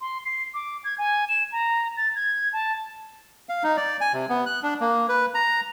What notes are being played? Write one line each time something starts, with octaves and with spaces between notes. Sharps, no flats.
C6
C7
D6
G#6
G#5
E7
A#5
A6
G#6
A5
F5
D#4
D5
G#5
C3
B3
F#6
D4
A#3
B4
A#5